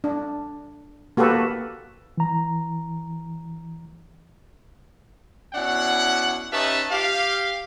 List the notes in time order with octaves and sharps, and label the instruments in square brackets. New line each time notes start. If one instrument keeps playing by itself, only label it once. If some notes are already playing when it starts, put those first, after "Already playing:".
[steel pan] D4
A#3 F#4 G4 A4 B4
[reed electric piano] E3 A#5
[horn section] B2 C#4 D4 E4 F#5
C#4 D#4 G4 B4 E5 A5
G4 F5